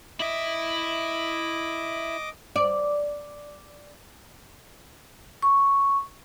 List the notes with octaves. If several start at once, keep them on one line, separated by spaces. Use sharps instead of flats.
E4 D#5 E5 D6
D5
C#6